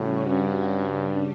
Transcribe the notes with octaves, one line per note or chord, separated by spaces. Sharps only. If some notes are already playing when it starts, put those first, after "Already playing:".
Already playing: A2 C#3 G3 C#4 F#4
G2
C#3 G3 D4